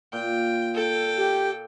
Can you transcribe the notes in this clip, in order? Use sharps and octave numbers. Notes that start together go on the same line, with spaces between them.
A#2 G5
A4 G5
G4